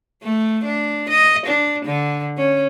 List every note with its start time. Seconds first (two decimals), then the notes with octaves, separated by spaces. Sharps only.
0.23 A3
0.64 D4
1.09 D#5
1.46 D4
1.86 D3
2.37 C#4